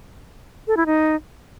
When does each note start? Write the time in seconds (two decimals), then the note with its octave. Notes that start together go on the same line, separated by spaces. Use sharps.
0.67 A4
0.77 E4
0.86 D#4